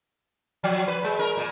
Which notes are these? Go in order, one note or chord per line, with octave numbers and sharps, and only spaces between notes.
F3
B4
G#3
A#4
A#2